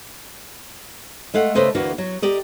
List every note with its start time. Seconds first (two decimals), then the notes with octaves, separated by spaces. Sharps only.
1.34 G#3 A3 F5 F#5
1.55 C#3 A3 B4 C5 D#5 E5
1.75 D2 E3 A#3 F#4
1.98 F#3
2.22 G4 A#4 D5 D#5